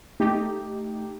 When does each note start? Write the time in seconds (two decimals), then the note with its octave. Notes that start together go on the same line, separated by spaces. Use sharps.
0.20 A3 D#4 G4